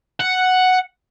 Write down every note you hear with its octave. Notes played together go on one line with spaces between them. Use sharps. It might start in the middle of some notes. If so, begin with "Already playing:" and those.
F#5